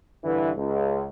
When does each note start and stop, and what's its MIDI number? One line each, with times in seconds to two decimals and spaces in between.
0.24 0.50 43
0.24 0.50 50
0.24 0.50 52
0.56 1.08 37